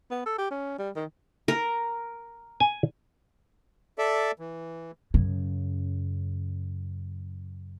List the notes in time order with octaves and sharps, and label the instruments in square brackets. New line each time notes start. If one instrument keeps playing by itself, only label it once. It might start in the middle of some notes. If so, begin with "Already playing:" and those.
[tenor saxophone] B3
A4
G4
C#4
G3
D#3
[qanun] A#4
[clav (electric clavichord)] G#5
[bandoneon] A4 D5 E5
E3
[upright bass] F#2 C#3